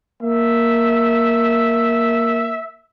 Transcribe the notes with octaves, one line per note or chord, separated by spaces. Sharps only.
A#3 E5